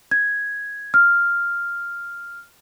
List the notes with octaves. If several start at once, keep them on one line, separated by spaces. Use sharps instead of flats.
G#6
F6